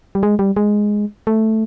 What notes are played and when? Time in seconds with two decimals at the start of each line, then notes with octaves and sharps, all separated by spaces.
0.15 G3
0.23 G#3
0.39 G3
0.56 G#3
1.27 A3